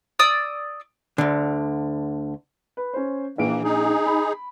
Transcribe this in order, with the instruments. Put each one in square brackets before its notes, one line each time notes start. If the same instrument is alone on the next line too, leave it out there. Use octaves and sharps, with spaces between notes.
[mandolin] D5 D#6 E6
[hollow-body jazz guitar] D2 D3
[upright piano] B4
C#4 C5
[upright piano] A#1 D7 [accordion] E3 A#3
[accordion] D#4 G#4
[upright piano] B5